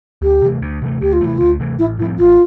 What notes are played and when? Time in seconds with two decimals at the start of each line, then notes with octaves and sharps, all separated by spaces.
0.22 D2 G4
0.42 C3 E3 A3
0.62 D2
0.82 C3 E3 A3
1.01 D2 G4
1.13 F4
1.21 C3 E3 A3 E4
1.38 D2 F4
1.60 C3 E3 A3
1.79 A1 E4
1.99 A2 F3 C4 E4
2.19 A1 F4